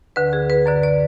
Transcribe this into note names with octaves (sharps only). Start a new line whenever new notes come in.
D2 D3 B4
G#4
B4
F#2 D3 D5
D5